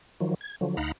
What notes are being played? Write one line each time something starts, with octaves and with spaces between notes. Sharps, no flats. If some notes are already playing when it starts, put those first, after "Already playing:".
D#3 F3 F#3
G#6
D3 F3 F#3
D2 D#4 F5 F#5 A#5 B5